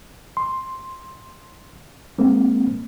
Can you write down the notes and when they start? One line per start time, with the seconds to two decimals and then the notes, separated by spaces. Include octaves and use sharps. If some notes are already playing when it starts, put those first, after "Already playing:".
0.37 C6
2.18 G#3 A#3 C4